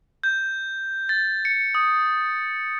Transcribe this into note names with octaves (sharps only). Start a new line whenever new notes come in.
G6
A6
C#7
D#6